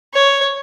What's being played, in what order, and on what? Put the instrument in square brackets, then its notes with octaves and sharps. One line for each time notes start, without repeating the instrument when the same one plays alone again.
[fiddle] C#5